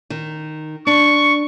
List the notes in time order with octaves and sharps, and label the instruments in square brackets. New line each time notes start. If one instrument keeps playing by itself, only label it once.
[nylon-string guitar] D#3
[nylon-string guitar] D4 [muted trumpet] C#6